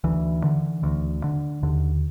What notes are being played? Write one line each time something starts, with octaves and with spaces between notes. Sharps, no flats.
D2 E3
D3
D2
D3
D#2 D3